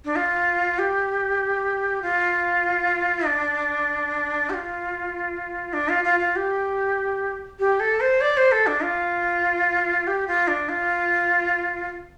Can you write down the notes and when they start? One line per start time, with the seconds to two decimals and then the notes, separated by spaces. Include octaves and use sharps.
0.05 D4
0.16 F4
0.79 G4
2.02 F4
3.26 D4
4.50 G4
4.54 F4
5.73 D4
5.89 F4
6.04 F4
6.20 F4
6.36 G4
7.60 G4
7.80 A4
8.01 C5
8.21 D5
8.37 C5
8.52 A4
8.67 D4
8.83 F4
10.07 G4
10.27 F4
10.48 D4
10.69 F4